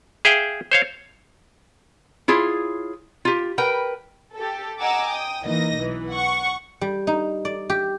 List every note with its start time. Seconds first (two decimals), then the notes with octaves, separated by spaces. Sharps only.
0.25 G#4 E5 F5 G5
0.72 C5 C#5 F5
2.28 E4 F4 G#4 C#5
3.25 F4 G4
3.58 A#4 B4 G5
4.36 G4 A4
4.80 D#5 F#5 G#5 A#5 D6 E6
5.10 G5 D#6
5.43 E3 A#3 D#4 D#5 A#6
5.77 B1 E3
6.10 F#5 C#6
6.81 G3
7.07 D#4
7.45 D5
7.70 G4